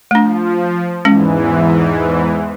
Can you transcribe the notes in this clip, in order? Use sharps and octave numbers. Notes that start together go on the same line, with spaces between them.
F3 A3 D4
E2 G#2 E3 G#3 C#4